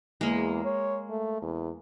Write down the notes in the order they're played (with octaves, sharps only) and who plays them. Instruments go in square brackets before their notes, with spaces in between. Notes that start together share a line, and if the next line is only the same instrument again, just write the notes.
[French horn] E2 [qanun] G#3 A#3
[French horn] C#5
A3
E2